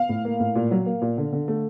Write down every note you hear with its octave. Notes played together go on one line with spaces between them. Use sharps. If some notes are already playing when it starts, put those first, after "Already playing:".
Already playing: F5
A2
A#3
A2
A#2
F#3
A#3
A#2
D3
D3
A3